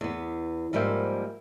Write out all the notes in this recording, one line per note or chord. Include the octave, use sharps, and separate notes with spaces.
E2 B3
G#2 F3 G3 A#3 C5 E5